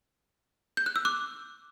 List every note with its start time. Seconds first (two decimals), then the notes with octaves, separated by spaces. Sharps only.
0.77 G6
0.86 F#6
0.96 E6
1.05 D6 F#6